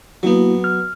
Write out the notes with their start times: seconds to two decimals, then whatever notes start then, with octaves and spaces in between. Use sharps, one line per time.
0.23 F#3 A#3 B3 E4 F#4
0.64 F6